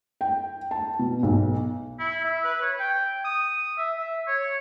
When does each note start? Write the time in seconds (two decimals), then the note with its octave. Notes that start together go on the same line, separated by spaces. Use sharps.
0.21 G5
0.71 A5
0.99 B2
1.23 B1
1.99 E4
2.24 E5
2.44 B4
2.62 C#5
2.79 G5
3.25 D#6
3.78 E5
3.97 E5
4.27 C#5